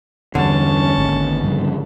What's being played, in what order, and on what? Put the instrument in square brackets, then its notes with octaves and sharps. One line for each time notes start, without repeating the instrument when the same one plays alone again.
[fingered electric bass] E2 G2 [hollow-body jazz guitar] D3 [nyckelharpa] C#4 A5
[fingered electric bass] G#1 D#2
G2 C#3 F3